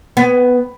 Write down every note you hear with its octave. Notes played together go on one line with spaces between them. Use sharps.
B3